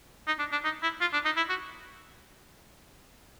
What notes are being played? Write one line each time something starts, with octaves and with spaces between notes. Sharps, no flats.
D#4
D4
D4
D#4
E4
F4
D4
D#4
E4
F#4